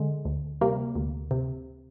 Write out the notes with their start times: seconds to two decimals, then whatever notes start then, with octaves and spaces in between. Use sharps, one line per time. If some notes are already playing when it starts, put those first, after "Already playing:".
Already playing: D3 G#3
0.25 D2
0.61 C3 G3 A#3
0.95 D2
1.31 C3